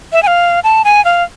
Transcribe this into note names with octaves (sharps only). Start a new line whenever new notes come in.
E5
G#5
F5
A5
G#5
F5